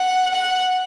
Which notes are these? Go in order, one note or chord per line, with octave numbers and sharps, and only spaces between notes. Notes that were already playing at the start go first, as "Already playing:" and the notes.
Already playing: F#5
F#5